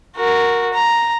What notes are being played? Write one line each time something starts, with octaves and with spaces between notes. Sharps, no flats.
F#4 A#4
A#5